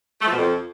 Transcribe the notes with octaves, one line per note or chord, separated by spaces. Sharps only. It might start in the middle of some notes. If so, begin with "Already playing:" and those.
A3
F3
B2
F2